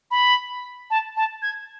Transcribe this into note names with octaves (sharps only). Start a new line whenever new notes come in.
B5
A5
A5
G#6